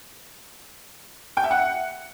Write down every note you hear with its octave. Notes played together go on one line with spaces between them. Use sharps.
G5
E5
F#5